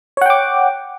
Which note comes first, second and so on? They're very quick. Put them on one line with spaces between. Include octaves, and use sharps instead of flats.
C#5 F#5 G5 D6